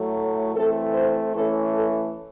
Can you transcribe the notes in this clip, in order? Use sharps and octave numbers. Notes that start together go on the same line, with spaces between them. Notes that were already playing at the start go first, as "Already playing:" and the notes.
Already playing: A2 F#3 A3
E3 A3 C4 A4
C5
E3 A3 C#4 A4
A4